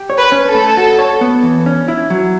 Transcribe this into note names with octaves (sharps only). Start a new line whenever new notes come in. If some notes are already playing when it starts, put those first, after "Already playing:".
Already playing: G4
C#5
B4
C#4
A4
A3
F#4
C#5
B3
E3
C#4
E4
F#3